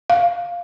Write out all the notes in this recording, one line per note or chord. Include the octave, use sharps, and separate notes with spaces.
F5